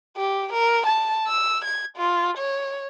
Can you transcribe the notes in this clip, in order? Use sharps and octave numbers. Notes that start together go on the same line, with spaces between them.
G4
A#4
A5
E6
G#6
F4
C#5